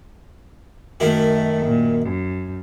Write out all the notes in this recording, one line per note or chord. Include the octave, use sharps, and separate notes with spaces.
F#2 D#3 A3 E4
A#2
F#2